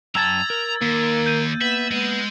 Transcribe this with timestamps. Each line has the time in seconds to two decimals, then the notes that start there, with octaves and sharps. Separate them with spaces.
0.15 F#2 G5 A5 A#5 E6 G#6 A6
0.50 A#4
0.82 D#2 A#3 A#4
1.26 G6 D#7
1.61 B3 E5 F#7
1.91 G#3 B3 D#5